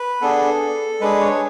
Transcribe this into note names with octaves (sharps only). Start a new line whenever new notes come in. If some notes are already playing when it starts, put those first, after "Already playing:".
Already playing: B4
B3 D4 G#4 A4
G#3 D4 G#4 B4
C#5